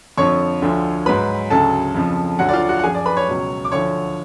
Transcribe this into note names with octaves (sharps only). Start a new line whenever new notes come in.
F2 D3 F3 C#5 C#6
D2 D3 F3
G#2 F#3 B4 B5
D2 C#3 F#3 A4 A5
F2 C#3 F3
D2 D3 F#3 F#4 F#5
D5
F4 F5
F#4 F#5
F#5
F#2 F3 G#4 G#5
D5
B4 B5
C#5 C#6
C#2 B2 F#3
D6
D2 D3 F3 C#5 C#6